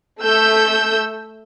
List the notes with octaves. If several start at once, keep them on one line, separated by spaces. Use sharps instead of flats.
A3 E6 G6